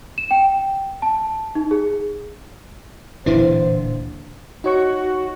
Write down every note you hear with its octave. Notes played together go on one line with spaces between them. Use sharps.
E7
G5
A5
D#4
G#4
D1 A#2 E3 D4 C5
D#4 F#4 C#5 C#6